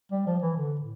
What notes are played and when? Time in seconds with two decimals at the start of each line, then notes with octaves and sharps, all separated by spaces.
0.12 G3
0.27 F3
0.42 E3
0.57 D3
0.80 A2